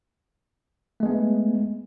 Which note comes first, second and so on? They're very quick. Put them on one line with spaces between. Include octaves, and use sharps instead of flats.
A3 G#3 B3